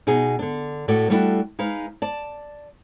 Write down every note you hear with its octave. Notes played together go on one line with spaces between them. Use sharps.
B2 D#4 G#4
D3 D4
A2 A3 F#4 D5
G3 A3 B3 D4 E4 F#4
G#3 D#4 B4 F5
D5 A5